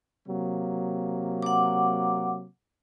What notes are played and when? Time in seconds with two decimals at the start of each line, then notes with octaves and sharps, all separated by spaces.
0.28 C3 F#3 A#3
1.42 F#5 D6